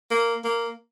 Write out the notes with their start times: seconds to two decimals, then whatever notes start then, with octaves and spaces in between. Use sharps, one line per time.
0.11 A#3
0.44 A#3